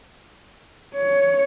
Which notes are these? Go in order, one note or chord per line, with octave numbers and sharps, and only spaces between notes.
C#5